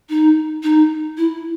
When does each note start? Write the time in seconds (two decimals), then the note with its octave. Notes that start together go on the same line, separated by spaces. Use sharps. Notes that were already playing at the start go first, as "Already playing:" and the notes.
0.09 D#4
0.63 D#4
1.17 E4